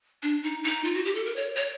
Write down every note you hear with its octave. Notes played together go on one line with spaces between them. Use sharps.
D4
D#4
D#4
F4
F#4
G4
A4
A#4
C#5
C#5